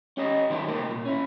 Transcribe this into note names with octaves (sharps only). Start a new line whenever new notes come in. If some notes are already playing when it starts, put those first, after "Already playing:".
C#4 G4 D#5
D#3 F#3 B3 C4 E4 G4
C3 A#3 D#4 A#4 C5 G5
B1 A#2
C#4 E4